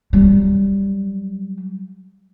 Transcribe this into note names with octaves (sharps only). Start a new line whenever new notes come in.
F#3 G3